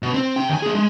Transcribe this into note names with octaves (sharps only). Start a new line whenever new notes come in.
B2
C4
C3 G5
D#2 G#5
A#3 G#4
G#3